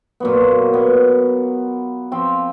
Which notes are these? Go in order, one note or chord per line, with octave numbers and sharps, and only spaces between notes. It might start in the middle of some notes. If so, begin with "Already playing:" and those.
A#2 F#3 B3
B3
F3 C4 G5